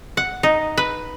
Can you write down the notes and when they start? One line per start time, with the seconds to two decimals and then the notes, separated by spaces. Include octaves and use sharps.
0.17 F#5
0.43 D#4
0.77 B4